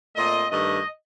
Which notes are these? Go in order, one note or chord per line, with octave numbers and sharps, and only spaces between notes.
A#2 A3 C4 D#5
G2 D#3 A3 D#5